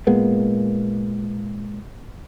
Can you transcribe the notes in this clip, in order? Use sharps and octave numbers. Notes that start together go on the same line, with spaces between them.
A#2 G#3 A#3 B3